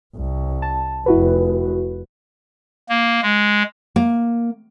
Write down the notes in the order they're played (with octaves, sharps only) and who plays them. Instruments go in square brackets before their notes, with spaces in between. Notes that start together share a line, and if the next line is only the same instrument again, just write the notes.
[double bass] C2
[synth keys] A5
[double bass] F1 [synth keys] E4 F#4 B4
[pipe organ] A#3
G#3
[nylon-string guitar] A#3